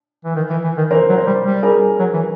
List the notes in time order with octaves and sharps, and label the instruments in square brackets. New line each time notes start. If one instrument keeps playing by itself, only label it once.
[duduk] E3
D#3
E3
E3
D#3
[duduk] E3 [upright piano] A#4 C5
[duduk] F#3
[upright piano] A#4 C5
[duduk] G3
G3
[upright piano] G#4 A#4
[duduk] F#3
E3